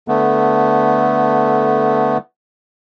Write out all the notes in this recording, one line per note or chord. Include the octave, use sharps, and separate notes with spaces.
D3 A3 B3